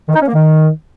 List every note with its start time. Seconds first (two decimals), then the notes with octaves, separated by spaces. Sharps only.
0.09 D#3
0.15 D#4
0.22 C#4
0.28 A#3
0.34 D#3